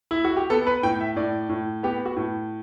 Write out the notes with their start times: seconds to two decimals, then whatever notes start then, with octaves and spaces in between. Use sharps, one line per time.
0.11 E4
0.24 F#4
0.37 G4
0.50 B3 A4
0.67 B4
0.83 A2 G5
1.00 E5
1.16 A2 D5
1.49 A2
1.83 B3 G4
2.05 F#4
2.16 A2